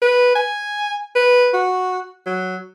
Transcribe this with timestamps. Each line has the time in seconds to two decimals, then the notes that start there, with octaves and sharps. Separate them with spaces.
0.02 B4
0.35 G#5
1.15 B4
1.54 F#4
2.26 F#3